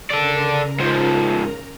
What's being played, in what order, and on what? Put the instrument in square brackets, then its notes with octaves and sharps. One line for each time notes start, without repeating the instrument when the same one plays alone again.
[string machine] C#3 A#4 A#5 [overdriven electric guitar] A4 D5
[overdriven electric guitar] G#2 F3